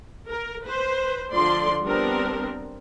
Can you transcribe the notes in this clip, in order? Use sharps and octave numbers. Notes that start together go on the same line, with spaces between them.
A#4
B4 C5
D3 F3 D5 C6
G3 B3 C4 D4 A#4